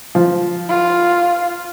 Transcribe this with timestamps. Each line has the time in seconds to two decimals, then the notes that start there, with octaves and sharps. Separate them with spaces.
0.15 F3
0.69 F4